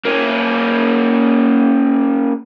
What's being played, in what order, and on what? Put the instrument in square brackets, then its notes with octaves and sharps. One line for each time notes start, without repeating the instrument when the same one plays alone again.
[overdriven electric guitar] A#3 C#4